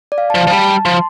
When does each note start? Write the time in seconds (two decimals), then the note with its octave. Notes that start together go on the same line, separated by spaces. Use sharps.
0.12 D5
0.18 F5
0.30 A5
0.35 F3
0.41 A5
0.47 F3
0.51 G3 A5
0.68 A5
0.85 F3 C6